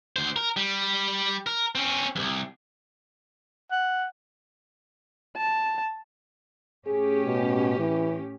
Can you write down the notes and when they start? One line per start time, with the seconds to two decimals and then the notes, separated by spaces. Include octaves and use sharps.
0.16 D2 C5
0.36 A#4
0.57 G3
1.46 A#4
1.75 C4 C#4
2.16 C2 F2
3.71 F#5
5.37 A5
6.87 A2 C#4 G4 G#4
7.26 B2
7.79 E3